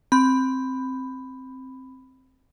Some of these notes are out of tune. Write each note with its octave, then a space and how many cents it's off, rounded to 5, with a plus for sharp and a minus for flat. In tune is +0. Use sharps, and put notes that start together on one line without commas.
C4 +5 B5 +10